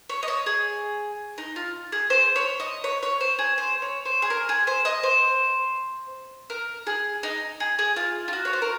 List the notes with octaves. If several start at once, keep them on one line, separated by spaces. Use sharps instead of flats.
C#5
D#5
C#5
G#4
D#4
F4
G#4
C5
C#5
D#5
C#5
C#5
C5
G#4
C5
C#5
C5
G#4
A#4
G#4
C5
D#5
C5
A#4
G#4
D#4
G#4
G#4
F4
F4
F#4
C#5
C5
A#4